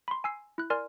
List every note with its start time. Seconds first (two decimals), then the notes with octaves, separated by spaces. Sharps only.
0.08 B5 C6
0.24 G#5 E6 C7
0.58 E4 F#6
0.70 A#4 D5 G#5 C6 F6